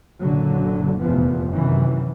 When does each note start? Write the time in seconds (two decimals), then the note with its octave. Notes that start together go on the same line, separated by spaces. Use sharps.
0.22 F#1 A#2 D3 F#3
1.01 F1 E2 A#2 F3 B3
1.50 F#2 C3 D#3 E3